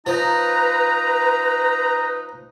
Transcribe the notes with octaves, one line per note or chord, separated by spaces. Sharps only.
F3 D#4 B4 A#5